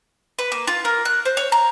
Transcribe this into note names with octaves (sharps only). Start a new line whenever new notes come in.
B4
A#3
F4
A#4
F#6
C5
C#5
A#5